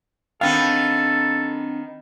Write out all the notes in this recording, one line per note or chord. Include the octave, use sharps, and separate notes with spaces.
D#3 B3 C4 D4 A4 F5